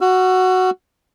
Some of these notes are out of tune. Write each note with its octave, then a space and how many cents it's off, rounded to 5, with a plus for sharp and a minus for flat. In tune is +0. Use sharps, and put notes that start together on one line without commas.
F#4 +0 E6 +40